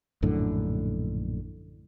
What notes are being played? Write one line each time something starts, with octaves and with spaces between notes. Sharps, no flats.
A#1 F#2 A2 D3